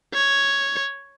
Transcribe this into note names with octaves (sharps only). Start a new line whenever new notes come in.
C#5